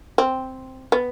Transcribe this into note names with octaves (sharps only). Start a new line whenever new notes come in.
C4
B3